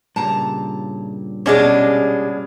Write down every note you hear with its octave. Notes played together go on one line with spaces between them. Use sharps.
G2 A#2 C#3 A5 A#5
B2 G#3 C#4 D4 G4 G#4